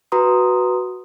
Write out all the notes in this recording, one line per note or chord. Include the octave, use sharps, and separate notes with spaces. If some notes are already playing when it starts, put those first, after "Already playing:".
F#4 B4 A#5 C6 D#6